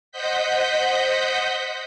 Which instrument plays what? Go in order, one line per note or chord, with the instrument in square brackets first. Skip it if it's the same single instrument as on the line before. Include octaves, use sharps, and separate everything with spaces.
[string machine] C5 D#5 F#5 G6 B6